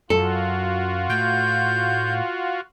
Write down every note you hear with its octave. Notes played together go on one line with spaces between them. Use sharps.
F#2 F4 F#4 A4
A2 G6